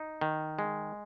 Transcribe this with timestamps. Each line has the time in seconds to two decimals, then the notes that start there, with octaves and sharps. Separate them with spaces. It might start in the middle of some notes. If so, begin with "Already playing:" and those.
Already playing: D#4
0.21 D#3
0.59 G#3